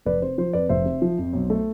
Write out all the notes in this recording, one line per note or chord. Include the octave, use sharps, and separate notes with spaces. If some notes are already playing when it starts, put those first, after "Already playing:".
F1 B4 D5
C3 C5
F3 C5
F2 B4 D5
F1 C5 E5
C3
F3
F2
B1
A3